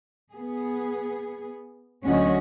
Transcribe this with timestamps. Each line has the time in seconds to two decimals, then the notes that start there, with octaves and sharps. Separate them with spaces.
0.34 B3 G#4
2.05 D2 F#3 C#4 F#4 D#5